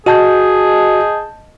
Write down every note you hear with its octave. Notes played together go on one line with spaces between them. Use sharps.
F#4 G#4 D#5 A5 G6